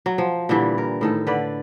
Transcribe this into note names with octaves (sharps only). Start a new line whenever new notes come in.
F#3
F3
A#2 D3 E3 G3
A#4
A2 D#3 A4
D3 B4 D5